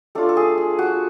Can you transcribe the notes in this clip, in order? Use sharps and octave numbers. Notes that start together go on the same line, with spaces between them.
A3 D4 F4 A4
A4
G#4
G#4
F#4